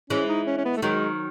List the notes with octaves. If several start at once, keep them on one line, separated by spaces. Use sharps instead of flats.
E3 G#3 C#4
D#4
C#4
C#4
B3
A3
D#3 F#3 G#3